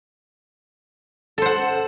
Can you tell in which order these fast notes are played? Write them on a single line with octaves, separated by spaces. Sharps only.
A4 C5 F#5